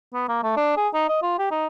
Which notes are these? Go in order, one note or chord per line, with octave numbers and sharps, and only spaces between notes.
B3
A#3
A3
D4
G#4
D#4
D#5
F4
G4
D#4